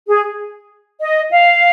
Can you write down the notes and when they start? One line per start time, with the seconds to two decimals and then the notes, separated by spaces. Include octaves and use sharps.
0.06 G#4
0.99 D#5
1.30 F5